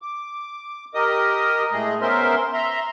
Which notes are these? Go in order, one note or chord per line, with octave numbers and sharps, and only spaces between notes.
D6
G4 A#4 D#5 D#6
A2 G#3 A3 G#4 D#5
B3 C#4 A#4 C5 E5 C6
E5 A#5 C6